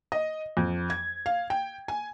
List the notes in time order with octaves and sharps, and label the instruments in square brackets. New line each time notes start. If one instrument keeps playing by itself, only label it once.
[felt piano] D#5
F2
G#6
F5
G5
G#5